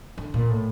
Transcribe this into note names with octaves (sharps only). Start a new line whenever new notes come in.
D3
A#2
A2